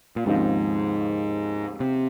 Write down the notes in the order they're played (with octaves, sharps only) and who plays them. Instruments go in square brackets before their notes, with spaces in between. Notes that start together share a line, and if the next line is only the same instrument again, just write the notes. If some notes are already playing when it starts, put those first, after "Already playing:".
[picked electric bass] A#2
[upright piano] D#2 C#3 F3 C4 D#4 [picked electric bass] G#2
[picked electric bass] C3